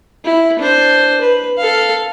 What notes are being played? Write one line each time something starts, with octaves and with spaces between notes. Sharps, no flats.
E4
D4 C5
B4
A4 F5